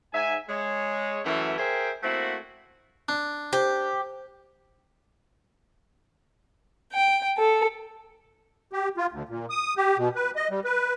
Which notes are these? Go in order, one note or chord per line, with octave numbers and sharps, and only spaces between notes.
G#2 E5 G#5
G#3 C#5
F#2 E3 A3
G#4 A#4 C5 E5 G5
A3 A#3 C4 E4 F#4
D4
G4 C5
G5
A4
G4
F4
D2
A#2
D#6
G4
B2
B4
D#5
G3
B4